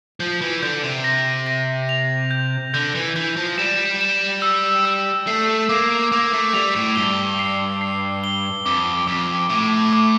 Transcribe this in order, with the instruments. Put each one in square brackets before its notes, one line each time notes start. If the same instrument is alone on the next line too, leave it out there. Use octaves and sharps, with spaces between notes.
[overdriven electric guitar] F3 [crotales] G6
[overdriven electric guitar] E3
[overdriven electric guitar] D3 [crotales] G6
[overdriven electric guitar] C3
[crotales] A#6
A#6
F7
G6
[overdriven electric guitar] D3 [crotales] G6
[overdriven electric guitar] E3
[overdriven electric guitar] E3 [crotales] G6
[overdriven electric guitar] F3
[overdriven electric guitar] G3 [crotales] E7
[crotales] E7
E6
E6
[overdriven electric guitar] A3 [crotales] C7
[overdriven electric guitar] A#3 [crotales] D6
[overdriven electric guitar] A#3 [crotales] D6
[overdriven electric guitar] A3
[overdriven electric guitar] G3 [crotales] F7
[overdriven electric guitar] A2
[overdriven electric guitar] G2 [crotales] G7
[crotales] C7
C7
G7
[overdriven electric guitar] F2 [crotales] D6
[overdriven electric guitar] F2 [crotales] D6
[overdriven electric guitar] A2 [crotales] D6
[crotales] D6